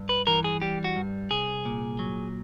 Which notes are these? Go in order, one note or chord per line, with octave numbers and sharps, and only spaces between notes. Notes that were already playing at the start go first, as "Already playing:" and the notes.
Already playing: G2
B4
E3 A#4
G#4
G3 G4
F#4
G2
C2 G#4
A#2
F#3